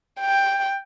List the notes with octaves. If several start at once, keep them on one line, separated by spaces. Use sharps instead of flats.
G5